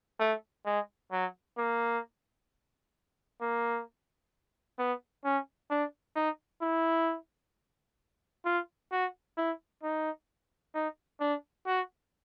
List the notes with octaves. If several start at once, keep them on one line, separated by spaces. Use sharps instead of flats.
A3
G#3
F#3
A#3
A#3
B3
C#4
D4
D#4
E4
F4
F#4
E4
D#4
D#4
D4
F#4